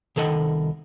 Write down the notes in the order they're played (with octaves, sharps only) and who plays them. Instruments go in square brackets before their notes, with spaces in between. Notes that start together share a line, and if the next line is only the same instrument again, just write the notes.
[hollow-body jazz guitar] C2 D#3 A4 D#5 F#5